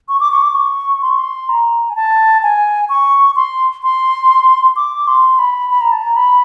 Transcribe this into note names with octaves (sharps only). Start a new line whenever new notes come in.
C#6
D6
C#6
D6
C#6
C6
C#6
C6
A#5
G#5
A5
G#5
C#6
C6
C6
D6
C6
B5
B5
A#5
A5
A#5
B5